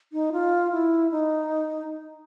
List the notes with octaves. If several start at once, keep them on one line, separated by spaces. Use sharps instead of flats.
D#4
F4
E4
D#4